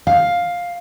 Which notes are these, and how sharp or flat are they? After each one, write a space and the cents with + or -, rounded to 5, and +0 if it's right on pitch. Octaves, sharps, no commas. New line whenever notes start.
F5 +10